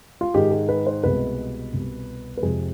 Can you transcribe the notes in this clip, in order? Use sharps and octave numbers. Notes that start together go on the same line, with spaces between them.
F4
G#2 D#3 G#3 G4
G#4
B4
C5
C2 B2 G#3 B4
C2 B2 G3
B4
F2 C3 F3 G#3 G#4